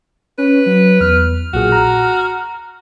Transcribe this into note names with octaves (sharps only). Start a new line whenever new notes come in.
C#4 B4
F#3
E2 F6
B1 A#2 F#4 G#4
A#5